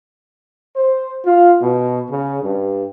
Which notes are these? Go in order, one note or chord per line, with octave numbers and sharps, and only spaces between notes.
C5
F4
B2
C#3
G2